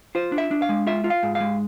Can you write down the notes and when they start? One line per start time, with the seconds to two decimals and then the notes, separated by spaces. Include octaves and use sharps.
0.15 F4 C5
0.32 D4
0.38 E5
0.51 D4
0.62 F5
0.69 G#3
0.87 F4 E5
1.04 F4
1.10 F5
1.23 G#2
1.35 F5
1.40 G#3